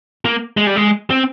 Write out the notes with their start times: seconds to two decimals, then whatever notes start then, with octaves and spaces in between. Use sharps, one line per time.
0.25 A#3
0.57 G#3
0.67 G3
0.76 G#3
1.10 C4